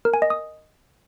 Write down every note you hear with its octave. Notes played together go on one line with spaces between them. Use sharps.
A#4
G#5
D#5
D#6